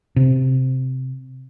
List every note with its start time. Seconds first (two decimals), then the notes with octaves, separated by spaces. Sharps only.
0.16 C3